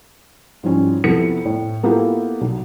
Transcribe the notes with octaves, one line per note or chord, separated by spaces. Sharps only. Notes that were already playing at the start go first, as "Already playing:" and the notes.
G#2 F3 G3 C#4 E4
F2 C3 B3 E4 A4 C#7
A2
A#3 B3 E4 F4 G4 A4
B1